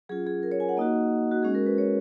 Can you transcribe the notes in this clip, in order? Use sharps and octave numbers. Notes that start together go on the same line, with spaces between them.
F#3 C#4 F4 G#4
G#4
A#4
C#5
G#5
F#5
A#3 D#4 F#4 D#5
F#4
G#3 C#4 F#4 G#4
A#4
B4
C#5